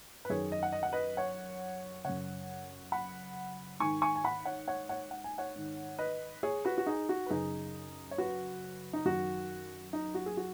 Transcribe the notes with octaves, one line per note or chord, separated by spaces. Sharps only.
B4
F#2 D#3 G#4 C#5
D#5
F#5
D#5
F#5
B4 D#5
C#5 F#5
F#2 C#3 C#5 F#5
F#5 B5
G#2 D#3 G#5 C#6
G#5 C#6
G#5
F#5 B5
C#5 F#5
C#5 F#5
C#5 F#5
F#5
G#5
C#5 F#5
G#2 D#3
B4 D#5
G#4 C#5
F#4 B4
F#4
D#4 G#4
F#4
B4
F#2 C#3 D#4 G#4
C#5
F#4 B4
D#4
F#2 D#3 F#4
D#4
F#4
G#4
F#4